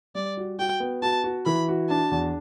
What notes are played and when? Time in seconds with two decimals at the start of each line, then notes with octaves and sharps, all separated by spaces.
0.15 G3 D5
0.37 F#4
0.59 F#4 G5
0.80 B3
1.02 F#4 A5
1.24 F#4
1.46 E3 B5
1.68 F#4
1.89 D4 A5
2.11 E2